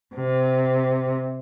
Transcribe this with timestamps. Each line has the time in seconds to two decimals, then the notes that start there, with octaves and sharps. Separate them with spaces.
0.15 C3